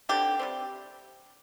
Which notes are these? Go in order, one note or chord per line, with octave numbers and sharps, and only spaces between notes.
D3 G3 C4 G4
C3 G3 C4